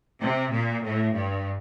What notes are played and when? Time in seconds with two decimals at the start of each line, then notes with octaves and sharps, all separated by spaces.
0.21 C3
0.51 A#2
0.82 A2
1.13 G2